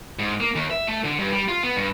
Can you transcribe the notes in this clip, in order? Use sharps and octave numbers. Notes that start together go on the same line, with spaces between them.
G#2
A#3
D#2
E5
A3
D3
G2
G3
F4
B3
G2